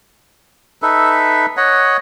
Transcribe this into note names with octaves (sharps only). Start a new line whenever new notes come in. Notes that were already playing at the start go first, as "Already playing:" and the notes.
D#4 A4 B4 E5
C#5 D#5 F#5